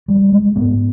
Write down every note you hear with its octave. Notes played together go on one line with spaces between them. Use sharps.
G3
G#3
G#2 B3